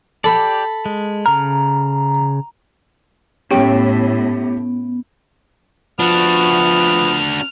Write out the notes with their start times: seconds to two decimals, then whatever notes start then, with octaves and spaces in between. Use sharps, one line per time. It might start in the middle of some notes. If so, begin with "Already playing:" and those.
0.24 G4 A4 D5 B5
0.86 G#3
1.26 C#3 A#5 F6
3.51 A2 B3 C#4 G4 C#5 G5 D7
6.00 F3 B3 D4 F#4 F6